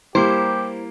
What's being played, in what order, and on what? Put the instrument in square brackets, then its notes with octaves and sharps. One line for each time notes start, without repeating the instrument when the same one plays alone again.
[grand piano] G3 A#3 [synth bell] E4 A#5 [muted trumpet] G4 [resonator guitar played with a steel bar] C5